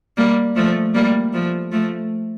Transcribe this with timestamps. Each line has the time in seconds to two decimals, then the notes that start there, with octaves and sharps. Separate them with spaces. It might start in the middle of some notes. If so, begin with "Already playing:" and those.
0.17 G3 A#3
0.56 F3 A3
0.94 G3 A#3
1.33 F3 A3
1.72 F3 A3